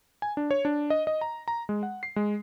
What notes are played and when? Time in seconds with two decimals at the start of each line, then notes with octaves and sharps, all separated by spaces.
0.22 G#5
0.37 D4
0.51 C#5
0.65 D4
0.90 D#5
1.07 D#5
1.21 A#5
1.48 A#5
1.69 G#3
1.83 F#5
2.03 C7
2.16 G#3